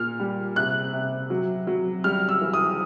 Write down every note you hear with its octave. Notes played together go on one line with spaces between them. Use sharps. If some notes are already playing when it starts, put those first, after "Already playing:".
Already playing: A#2 F6
G3
C3 F#6
C3
F#3
F#3
G3 F6
E6
E3
D#6